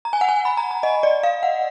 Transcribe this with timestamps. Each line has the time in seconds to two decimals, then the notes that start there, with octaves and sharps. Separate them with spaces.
0.05 A#5
0.13 G#5
0.21 F#5
0.29 G#5
0.45 B5
0.57 A#5
0.71 A#5
0.83 D#5
1.03 D5
1.23 F5
1.43 F#5